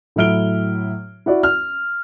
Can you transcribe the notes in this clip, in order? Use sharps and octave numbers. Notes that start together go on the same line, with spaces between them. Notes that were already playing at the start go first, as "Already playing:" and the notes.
A2 F#3 E4 F6 D7 G7
E4 F#4 D5
F6